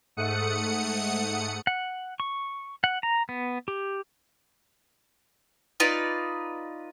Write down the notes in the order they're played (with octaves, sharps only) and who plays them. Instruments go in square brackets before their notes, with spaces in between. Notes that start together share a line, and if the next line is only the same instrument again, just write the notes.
[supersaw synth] G#2 A3 F#5 D#6 C#7
[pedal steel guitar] F#5
C#6
F#5
A#5
B3
G4
[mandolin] D#4 F4 B4 D5